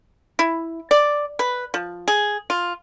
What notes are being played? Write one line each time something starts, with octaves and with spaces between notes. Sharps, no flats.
E4
D5
B4
F3
G#4
F4